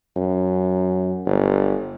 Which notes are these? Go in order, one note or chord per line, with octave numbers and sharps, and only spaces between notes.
F#2
G1